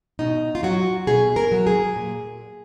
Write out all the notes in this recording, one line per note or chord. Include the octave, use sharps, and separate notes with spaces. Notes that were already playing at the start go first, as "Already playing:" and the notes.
B2 D#4
F4
F#3 F#4
B2 G#4
A#4
F#3
G#4
A#2